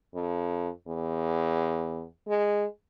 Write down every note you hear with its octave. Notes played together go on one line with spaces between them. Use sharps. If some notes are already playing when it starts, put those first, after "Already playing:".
F2
E2
G#3